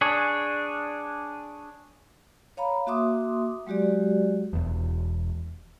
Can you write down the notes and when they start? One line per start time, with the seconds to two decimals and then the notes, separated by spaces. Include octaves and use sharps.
0.01 D4 G#4 C#5
2.57 C#5 F5 A#5 B5
2.87 A#3 F#4 E5 C6 D6 D#6
3.67 F#3 G#3 F#4 G4 D5
4.53 E1 E2